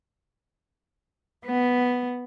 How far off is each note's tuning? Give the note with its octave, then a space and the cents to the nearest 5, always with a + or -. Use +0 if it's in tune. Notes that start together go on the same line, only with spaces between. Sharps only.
B3 +0